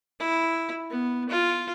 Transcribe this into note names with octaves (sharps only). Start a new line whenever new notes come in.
E4
B3
F4